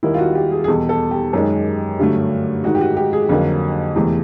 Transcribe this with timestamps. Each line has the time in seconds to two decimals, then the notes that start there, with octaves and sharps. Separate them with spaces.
0.03 D#2 D#3 G3 A#3 E4
0.14 F4
0.18 F#4
0.35 G4
0.51 G#4
0.64 G#4
0.68 E2 B2 G3 A4
0.89 A4
1.11 G4
1.33 F#2 D#3 G#3
1.99 G2 D3 F#3 A3
2.64 G#2 D#3 G#3 F#4
2.75 G4
2.81 F#4
2.97 G4
3.13 G#4
3.29 F2 D3 F#3 A#3
3.96 E2 C3 E3 A3